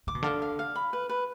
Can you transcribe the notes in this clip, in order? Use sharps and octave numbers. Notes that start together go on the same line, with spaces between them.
D3 D6
B2
D3 F5
F5
F5
B5
B4
B4